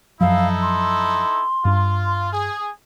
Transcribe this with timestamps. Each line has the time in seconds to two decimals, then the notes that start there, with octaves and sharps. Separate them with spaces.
0.21 F#2 F3 F#3 D#4 E4 A4 F5
0.62 C6
1.65 G2 D4 F4
2.32 G#4